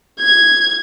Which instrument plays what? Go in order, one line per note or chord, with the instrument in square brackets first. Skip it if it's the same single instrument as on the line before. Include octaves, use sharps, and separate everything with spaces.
[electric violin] G#6